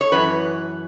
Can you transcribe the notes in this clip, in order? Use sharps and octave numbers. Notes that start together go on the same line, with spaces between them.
C#5
F#2 E3 B4